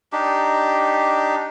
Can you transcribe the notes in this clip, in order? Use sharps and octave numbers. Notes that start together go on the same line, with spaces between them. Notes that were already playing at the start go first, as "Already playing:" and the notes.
D4 D#4 G4